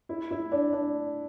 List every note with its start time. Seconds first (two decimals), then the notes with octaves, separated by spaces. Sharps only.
0.09 E4
0.31 E4
0.52 D4
0.73 D4